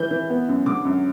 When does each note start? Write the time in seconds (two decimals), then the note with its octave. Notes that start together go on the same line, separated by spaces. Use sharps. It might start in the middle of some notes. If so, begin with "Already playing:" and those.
Already playing: E3 G6
0.11 E3
0.30 B3
0.48 F#2
0.66 D3 D6
0.85 F#2